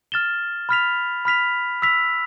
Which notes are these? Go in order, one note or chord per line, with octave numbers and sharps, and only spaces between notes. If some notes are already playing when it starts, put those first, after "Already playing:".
F6 A6 E7 G7
B5 F6 B6 F7
B5 F6 B6 F7
E6 B6 F7